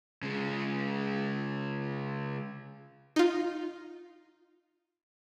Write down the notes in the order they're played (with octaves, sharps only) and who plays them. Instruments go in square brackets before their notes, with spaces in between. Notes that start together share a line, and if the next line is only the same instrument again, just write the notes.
[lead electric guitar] C#3 G#3
[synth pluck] D#4 F4